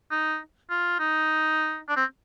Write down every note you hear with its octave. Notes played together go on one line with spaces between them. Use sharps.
D#4
F4
D#4
D4
C4